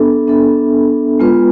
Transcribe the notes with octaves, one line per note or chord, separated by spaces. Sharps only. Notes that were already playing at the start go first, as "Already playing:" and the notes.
Already playing: B3 D4 A4 E5
B3 D4 A4 E5
G#3 B3 F4 B4